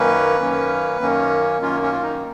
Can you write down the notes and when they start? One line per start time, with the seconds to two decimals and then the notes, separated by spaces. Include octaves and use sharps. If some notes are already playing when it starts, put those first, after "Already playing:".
Already playing: F#2 D#3 A#3 C#4 B4
0.40 F#2 D#3 A#3 C#4
1.01 F#2 D#3 A#3 C#4
1.62 F#2 D#3 A#3 C#4 F4
1.82 C#4
1.93 F4
2.03 D#4